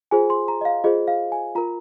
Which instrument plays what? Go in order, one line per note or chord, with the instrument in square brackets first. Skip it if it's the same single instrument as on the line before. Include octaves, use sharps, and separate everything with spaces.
[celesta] F4 G#4 C5 G#5
C6
A#5
D#5
F5
F4 G#4 C5 D#5
F5
G#5
F4 A#4 A#5